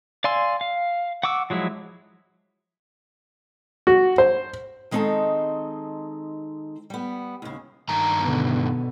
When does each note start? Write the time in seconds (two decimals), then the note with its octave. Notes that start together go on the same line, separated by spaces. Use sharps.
0.24 D5 F5 G#5 C6 E6
0.61 F5
1.23 F#5 C#6 D6 E6
1.50 F3 F#3 G#3 E4
3.87 F#4
4.18 C5
4.91 D#3 G#3 C4 D#4 A4 A5
6.90 G3 B3
7.42 D#2 C#3
7.89 G2 D#3 A#5
8.21 B2 D3 B3